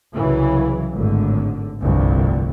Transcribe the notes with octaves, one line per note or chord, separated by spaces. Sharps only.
C2 C#3 E3 F#3
G#1 A2 D3
F1 C2 G2 D3